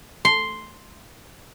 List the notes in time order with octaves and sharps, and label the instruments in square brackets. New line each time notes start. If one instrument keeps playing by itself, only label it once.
[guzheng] C6